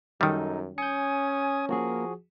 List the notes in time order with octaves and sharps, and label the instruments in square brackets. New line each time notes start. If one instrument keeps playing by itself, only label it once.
[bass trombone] F#2 [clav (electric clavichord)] D#3 G3 [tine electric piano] D#4 A4
[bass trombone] C#4 [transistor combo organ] G#5 D#6 [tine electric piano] G6 C#7
[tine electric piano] F3 F#4 G#4 [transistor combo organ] A#3